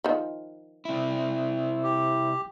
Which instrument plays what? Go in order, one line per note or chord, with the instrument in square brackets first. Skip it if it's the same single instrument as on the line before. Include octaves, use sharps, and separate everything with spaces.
[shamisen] D#3 F3
[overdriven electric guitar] C3 E4
[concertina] G4